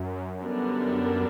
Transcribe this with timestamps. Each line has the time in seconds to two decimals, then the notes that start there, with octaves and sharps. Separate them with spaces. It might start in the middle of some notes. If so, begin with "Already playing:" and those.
Already playing: F#2
0.39 D3 G3 B3 D4 A#4